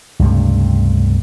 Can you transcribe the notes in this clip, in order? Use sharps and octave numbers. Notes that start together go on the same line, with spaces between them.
C#2 G2 C3 A3